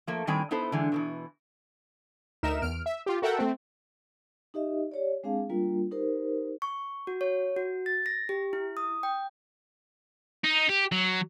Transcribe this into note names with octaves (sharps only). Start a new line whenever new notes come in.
F3 A3 A#3
A2 D#3 G3 C4 G5 G#5
B3 D#4 E4 A4 C5
D3 E3 G#3
B2 D#3 E3
D2 D#4 A#4 E5 E7
E2 F6 D7
E5
F4 G4
F#4 A4 A#4 E5 F#5 G5
A3 C4
D#4 G4 D#5 E5
G4 C#5 D5
G#3 C4 D4 G#4 F5 A5
G3 A#3 D4 F4 A#4
D#4 G4 A#4 C5
C#6
F#4
C#5
F#4
A6
A#6
G4
E4
D#6
G5
D#4
G4
F#3